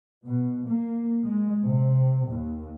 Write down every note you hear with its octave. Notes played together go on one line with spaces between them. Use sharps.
B2
A#3
G#3
C3
D#2